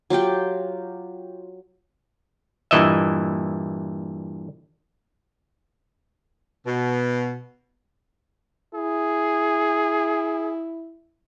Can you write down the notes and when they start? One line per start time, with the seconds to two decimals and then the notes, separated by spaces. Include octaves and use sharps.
0.10 F#3 F4 G4 G5
2.71 G2 A#2 E3 D#5 E5
6.66 B2
8.75 E4 G#4